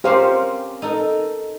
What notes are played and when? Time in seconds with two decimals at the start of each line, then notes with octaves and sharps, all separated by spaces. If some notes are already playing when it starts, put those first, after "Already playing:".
0.04 C4 C#4 G4 A#4 C5 F5
0.82 D#4 A4 A#4